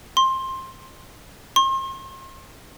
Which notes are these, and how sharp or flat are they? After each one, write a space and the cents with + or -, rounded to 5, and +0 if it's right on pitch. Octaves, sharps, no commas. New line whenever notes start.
C6 +15
C6 +40